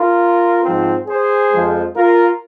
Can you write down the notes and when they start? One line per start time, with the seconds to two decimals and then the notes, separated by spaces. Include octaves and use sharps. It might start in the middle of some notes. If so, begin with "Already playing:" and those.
Already playing: F4 A#4
0.63 G#2 F3 C4
1.08 G#4 C5
1.52 F2 F3 G#3
1.96 F4 A#4